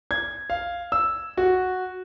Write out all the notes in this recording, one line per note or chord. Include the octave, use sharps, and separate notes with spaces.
G#6
F5
E6
F#4